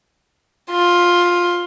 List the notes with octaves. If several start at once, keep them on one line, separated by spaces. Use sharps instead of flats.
F4